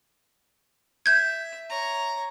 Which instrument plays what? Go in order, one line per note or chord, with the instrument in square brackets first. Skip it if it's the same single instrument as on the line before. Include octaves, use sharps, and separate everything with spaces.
[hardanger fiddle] E5 [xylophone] G6 G#6
[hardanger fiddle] C#5 A#5